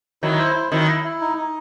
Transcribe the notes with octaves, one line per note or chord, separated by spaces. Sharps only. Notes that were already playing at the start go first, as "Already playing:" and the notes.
D#3 F#3 E4
C5
E4
D#3 F#3 E4
E4
E4
D#4
D#4